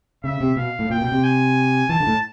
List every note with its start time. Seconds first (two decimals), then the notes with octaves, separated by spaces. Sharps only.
0.24 C#3 E5
0.41 C3
0.56 B2 F5
0.79 A2
0.90 A#2 G5
1.01 B2
1.12 C3
1.24 G#5
1.89 E3 A5
2.00 D3
2.07 A2